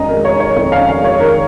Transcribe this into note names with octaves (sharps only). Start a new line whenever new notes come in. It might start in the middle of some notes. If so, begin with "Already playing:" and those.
Already playing: F2 D#3 G#3 C#4 D#5 A#5
A#4
G#3
C#5
D#3
C#5
F2 C#5
F5
C#4
F5
G#3 C#5
D#3 A#4